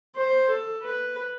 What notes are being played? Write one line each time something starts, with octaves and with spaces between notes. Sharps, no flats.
C5
A4
B4